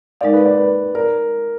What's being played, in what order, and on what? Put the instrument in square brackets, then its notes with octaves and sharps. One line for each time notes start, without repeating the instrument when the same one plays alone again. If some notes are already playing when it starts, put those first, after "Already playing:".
[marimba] G#3 D#4 A#4 F5 [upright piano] D5
[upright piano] B4
D5
B4
[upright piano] A#4 [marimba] D5